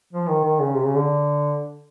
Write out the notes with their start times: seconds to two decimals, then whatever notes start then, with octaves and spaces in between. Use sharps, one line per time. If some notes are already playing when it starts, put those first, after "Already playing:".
0.13 F3
0.28 D#3
0.44 D#3
0.59 C#3
0.75 C3
0.85 C#3
0.95 D3